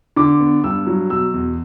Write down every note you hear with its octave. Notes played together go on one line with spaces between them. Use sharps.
D3 D6
B3
G2 E6
F#3
B2 E6
E2